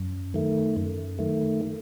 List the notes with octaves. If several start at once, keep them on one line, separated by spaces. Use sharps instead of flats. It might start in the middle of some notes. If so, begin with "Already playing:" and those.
Already playing: F#2
D#3 A3
F#2
D#3 A3